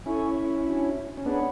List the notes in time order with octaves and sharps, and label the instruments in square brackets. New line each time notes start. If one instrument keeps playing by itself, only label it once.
[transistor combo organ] C#4 E4 [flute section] A4 C#5 G#5 C#6
[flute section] D4 F#4 C#5 G#5
[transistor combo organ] C#4
[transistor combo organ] B3 D4 [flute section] G#4 C#5 F#5 B5